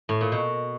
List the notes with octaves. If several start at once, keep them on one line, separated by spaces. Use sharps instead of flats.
A2
A#2
B2